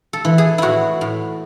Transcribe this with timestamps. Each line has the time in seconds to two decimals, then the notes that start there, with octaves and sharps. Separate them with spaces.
0.13 A4
0.25 E3
0.38 G#4
0.58 A2 E4 F#4
1.01 A2